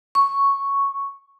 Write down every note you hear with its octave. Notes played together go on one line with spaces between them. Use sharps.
C#6